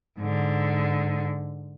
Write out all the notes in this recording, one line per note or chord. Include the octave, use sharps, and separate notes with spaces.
G#2 D3